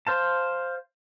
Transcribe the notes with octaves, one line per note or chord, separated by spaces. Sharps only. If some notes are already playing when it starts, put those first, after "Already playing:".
C5 F5 A5